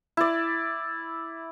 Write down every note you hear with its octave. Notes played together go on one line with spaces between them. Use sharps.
E4 D5